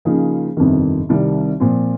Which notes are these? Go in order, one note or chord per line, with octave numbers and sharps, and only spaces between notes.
C#3 F3 A#3 D#4 G#4
G1 F2 C3 D#3
C2 C3 D#3 G3
A#2 F3 C4